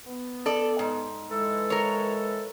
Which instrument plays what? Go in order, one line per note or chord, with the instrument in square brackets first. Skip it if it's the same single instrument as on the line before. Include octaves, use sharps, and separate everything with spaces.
[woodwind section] B3
[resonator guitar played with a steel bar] A4 D5
G#2
[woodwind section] E3 G#3 A4
[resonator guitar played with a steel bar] A#4 C#5